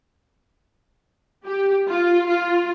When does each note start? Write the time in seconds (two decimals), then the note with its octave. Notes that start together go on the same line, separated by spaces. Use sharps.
1.45 G4
1.88 F4
2.27 F4